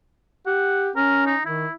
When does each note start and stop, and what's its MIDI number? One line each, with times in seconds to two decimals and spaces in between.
0.46 0.90 67
0.46 0.90 78
0.96 1.34 61
0.96 1.25 70
1.26 1.43 63
1.46 1.66 51
1.46 1.73 64